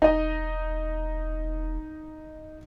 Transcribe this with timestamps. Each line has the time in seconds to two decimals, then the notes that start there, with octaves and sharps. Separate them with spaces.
0.02 E1 D#4 D#5